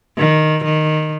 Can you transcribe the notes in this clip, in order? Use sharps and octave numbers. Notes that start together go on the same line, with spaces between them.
D#3
D#3